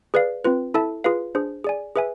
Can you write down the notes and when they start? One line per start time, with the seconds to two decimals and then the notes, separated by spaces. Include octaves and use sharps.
0.14 G#4 B4 D5 F5
0.44 C4 F4 B4
0.74 E4 A4 E5 A5
1.04 F4 G#4 B4 F5
1.35 D4 G#4 C5
1.64 G#4 D5 G#5
1.96 G#4 B4 E5 G#5